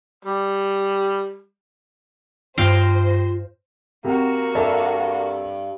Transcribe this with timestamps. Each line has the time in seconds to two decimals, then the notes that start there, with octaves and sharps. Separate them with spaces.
0.25 G3
2.58 G2 F4 C5 F5 G5 A#6
4.04 C3 A#3 F#4
4.55 G2 A4 D5 E5